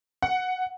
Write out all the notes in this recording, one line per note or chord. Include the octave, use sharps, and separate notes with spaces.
F#5